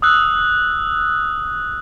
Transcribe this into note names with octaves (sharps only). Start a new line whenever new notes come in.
D#6 E6 F#6